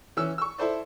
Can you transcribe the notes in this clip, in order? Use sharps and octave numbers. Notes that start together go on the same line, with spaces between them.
E3 C#4 E6
C#6 E6
E4 A4 C5 D5